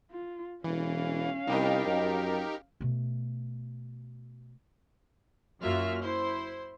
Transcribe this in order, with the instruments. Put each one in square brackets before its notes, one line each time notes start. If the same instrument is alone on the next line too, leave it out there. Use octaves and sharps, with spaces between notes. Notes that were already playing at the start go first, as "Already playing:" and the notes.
[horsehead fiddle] F4
[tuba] E1 [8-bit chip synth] E3 [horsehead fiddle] C#4 F5
[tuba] C2 [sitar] F2 D#5 [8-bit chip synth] D#4 G4 A#4
[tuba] F#2
[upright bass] B2 A3
[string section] F#2 A#3 F4 F#4 E5 F6
E4 C5 C6